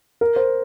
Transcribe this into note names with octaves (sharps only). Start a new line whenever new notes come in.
A#4
C5